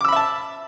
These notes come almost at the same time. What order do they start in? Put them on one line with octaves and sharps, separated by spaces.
D6 E6 B5 E5 A5